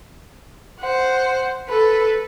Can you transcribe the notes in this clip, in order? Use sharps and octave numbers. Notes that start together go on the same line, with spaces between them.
C5 F#5
A4 B4